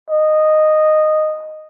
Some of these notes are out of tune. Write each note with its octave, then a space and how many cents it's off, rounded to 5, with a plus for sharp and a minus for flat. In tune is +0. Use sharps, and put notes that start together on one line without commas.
D#5 -10